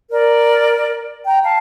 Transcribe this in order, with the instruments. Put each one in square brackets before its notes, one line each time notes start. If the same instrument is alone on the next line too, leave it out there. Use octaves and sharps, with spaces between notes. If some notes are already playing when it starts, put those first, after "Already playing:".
[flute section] A#4 D5
G5 A#5
F5 A5